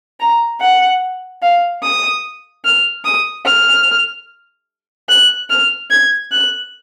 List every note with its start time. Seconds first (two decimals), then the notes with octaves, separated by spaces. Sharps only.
0.20 A#5
0.61 F#5
1.42 F5
1.83 D#6
2.65 F6
3.05 D#6
3.46 F6
5.09 F#6
5.50 F6
5.90 G#6
6.32 F#6